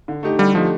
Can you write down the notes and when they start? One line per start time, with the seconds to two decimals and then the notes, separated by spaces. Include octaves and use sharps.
0.08 D3
0.23 A3 D#4 G4
0.39 D3 G3
0.55 F3 A3 D#4 G4